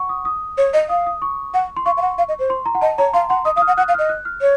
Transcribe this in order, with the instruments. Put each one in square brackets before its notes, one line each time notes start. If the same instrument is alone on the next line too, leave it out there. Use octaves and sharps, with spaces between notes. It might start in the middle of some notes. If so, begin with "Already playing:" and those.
Already playing: [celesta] F#5 C#6
D#6
D#6
[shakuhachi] C#5
D#5
[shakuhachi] F5 [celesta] D#6
[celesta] D#6
C#6
[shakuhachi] F#5
[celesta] C6
[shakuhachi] F5 [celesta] C#6
[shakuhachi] F5
F#5
F5
D#5
C5
[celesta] C6
A#5
F#5
[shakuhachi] D#5 [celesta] A5
[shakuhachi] C#5 [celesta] A#5
[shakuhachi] F5 [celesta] C6
[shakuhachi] F#5 [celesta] C6
[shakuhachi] D#5 [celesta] D#6
[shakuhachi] F5 [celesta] D#6
[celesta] F6
[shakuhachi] F#5
[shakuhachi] F#5 [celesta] F#6
[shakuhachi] F5
[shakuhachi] D#5 [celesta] F6
[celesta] F#6
F6
[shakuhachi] C#5